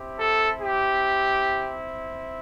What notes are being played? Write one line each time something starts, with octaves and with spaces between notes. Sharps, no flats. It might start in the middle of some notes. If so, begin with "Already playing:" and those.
Already playing: C4 E4 G4
A4
G4